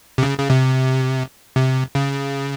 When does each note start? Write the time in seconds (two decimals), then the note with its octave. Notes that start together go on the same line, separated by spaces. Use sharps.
0.18 C3
0.23 C#3
0.39 C#3
0.50 C3
1.56 C3
1.95 C#3